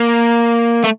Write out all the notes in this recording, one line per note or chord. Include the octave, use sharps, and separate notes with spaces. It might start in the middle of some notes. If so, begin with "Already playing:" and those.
Already playing: A#3
A3